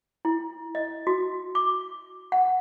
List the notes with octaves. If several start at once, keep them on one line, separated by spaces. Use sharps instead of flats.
E4
D#5
F#4
D6
F#5